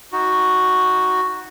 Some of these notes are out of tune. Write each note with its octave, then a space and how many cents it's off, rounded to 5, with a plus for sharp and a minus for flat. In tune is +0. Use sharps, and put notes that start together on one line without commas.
D#4 +20 F#4 +0